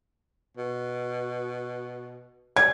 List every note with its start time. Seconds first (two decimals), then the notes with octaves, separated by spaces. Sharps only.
0.57 B2
2.56 G3 G#6